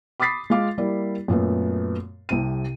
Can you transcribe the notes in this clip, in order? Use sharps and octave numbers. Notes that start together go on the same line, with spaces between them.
B5 D6 D#6 A6 B6 C7
G#3 F4 F5 D6
G3 A#3 E4 D5
F#2 A#2 A3 B3
C2 C3 D#7